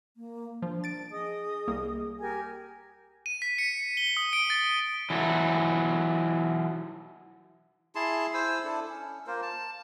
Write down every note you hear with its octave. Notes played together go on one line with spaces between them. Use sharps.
A#3
F3 D4
A6 D7
G#4 D#5 D#6
C2 A#3
G4 A#4 G#5
D#7
B6
C#7
G7
D#6
D7
A6
E3 F#3 A4
E4 G#4 A5 C6
E4 C5 G#5 E6
D4 E4 A4
C#4
A#3 F4 A#4 C5
A5